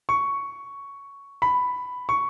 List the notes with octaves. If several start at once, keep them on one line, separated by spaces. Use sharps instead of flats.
C#6
B5
C#6